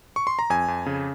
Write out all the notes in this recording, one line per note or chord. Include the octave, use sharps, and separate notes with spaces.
C#6
C6
A#5
F2 G#5
F2
C#3